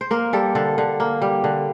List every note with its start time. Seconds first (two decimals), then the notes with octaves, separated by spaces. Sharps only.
0.01 C5
0.11 A#3 A#4
0.33 G3 A4
0.55 D3 A4
0.78 D3
1.00 A#3
1.22 G3
1.44 D3